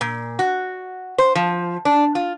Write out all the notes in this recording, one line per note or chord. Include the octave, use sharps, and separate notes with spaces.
A#2
F#4
C5
F3
D4
F4